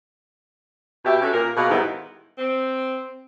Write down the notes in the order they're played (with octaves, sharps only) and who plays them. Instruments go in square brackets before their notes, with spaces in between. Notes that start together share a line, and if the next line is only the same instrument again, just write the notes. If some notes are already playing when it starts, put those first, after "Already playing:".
[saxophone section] B2 G4 E5
C#4 F#4 A4 E5
A#2 A#4
B2 A#3 B3 G#4 F5 F#5
G#2 D#3 G3 B3 D#4 E4
C4